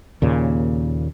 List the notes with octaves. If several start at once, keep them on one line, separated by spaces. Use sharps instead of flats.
D#2 A#2 C#3